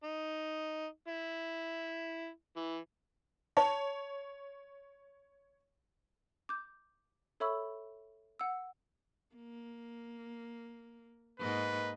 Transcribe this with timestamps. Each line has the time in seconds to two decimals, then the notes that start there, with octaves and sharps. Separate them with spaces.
0.04 D#4
1.08 E4
2.57 E3
3.57 C#5 A5
6.49 D6 G6
7.40 A4 C#5 E5 B5 C#6 E6
8.39 F#5 E6
9.36 A#3
11.40 G#2 A#3 B4 D#5